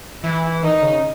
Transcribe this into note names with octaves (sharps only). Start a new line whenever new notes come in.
E3 E4
D#3 D#4
C#3